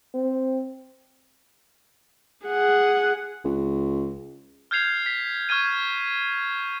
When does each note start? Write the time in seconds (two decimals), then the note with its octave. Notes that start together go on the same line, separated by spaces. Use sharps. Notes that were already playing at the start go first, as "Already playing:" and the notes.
0.14 C4
2.47 G#4 F#5
3.44 C#2
4.71 F6 G6 G#6 C7 F7
5.06 B6
5.49 C#6 F6 G#6 D#7